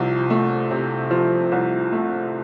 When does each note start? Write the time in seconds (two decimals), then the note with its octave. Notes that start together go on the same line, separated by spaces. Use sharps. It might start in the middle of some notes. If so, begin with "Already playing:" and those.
Already playing: C2 C3 F3
0.30 A3
0.71 C3
1.11 F3
1.52 C2
1.92 A3